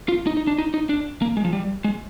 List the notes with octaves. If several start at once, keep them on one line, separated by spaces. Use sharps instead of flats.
F4
D#4
D#4
D4
D#4
D#4
D4
A#3
G#3
F3
G3
G#3